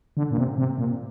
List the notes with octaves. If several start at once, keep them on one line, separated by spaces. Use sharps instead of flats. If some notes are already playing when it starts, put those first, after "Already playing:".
D3
A#2
C3
C3
A#2